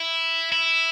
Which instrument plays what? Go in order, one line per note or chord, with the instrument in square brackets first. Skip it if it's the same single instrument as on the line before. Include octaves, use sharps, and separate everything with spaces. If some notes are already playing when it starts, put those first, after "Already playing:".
Already playing: [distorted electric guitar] E4
E4